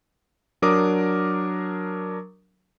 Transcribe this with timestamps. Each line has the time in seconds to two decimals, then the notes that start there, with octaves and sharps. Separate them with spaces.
0.62 F#3 D4 A#4 D6 D#6